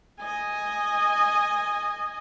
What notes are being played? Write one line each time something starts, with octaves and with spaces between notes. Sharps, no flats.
D#5 G#5